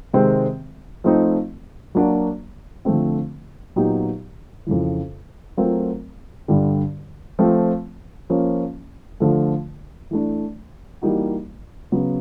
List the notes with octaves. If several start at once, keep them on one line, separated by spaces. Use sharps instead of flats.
C3 D#3 G#3 C4
F3 A3 C4 D#4
F#3 A#3 D4 F#4
D3 F3 A3 C4
A#2 F#3 B3 D#4 G4
F2 C#3 E3
F#3 A3 C4 F4 A#4
G2 D3 G3
F3 A3 C4
F3 A#3 C#4
D3 F3 A3
E3 A3 D4
E3 G3 A#3 D#4 F#4
C#3 F#3 B3